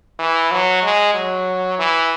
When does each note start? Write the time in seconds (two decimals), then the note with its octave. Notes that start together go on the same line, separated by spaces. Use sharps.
0.19 E3
0.51 F#3
0.83 G#3
1.14 F#3
1.79 E3